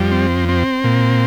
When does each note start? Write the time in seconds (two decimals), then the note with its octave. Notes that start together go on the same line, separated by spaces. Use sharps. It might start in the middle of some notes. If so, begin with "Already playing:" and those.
Already playing: F2 G3
0.12 C4
0.49 C4
0.84 A#2